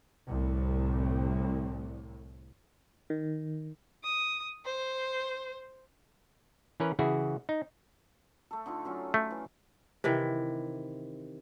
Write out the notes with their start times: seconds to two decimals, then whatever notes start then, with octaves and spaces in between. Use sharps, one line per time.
0.31 C2 A2
3.10 D#3
4.04 D#6
4.65 C5
6.80 E3 C#4 A#4 B4
6.99 C#3 E3 E4 F#4 G#4
7.49 D#4
8.51 A3 A4
8.66 D3 D#4 F4
8.85 F#3 C#4 F4
9.14 A3
9.31 E3
10.04 C3 D#3 E3